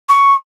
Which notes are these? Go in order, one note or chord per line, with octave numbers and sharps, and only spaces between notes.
C#6